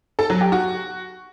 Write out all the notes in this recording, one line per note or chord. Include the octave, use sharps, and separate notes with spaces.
A4
F#3
G4
F#4